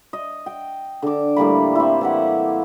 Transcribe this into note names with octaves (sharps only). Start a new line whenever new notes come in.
D#5
G5
D3 D6
A2 G3 A#3 B5
C4 E4
E3 G4 F#5